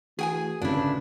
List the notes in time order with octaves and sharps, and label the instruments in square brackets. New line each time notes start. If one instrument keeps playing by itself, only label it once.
[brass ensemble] E3 A3 F#4 [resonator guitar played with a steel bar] G#4 G5 G#5
[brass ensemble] A1 [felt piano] D2 C#3 [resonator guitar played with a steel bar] D4 E4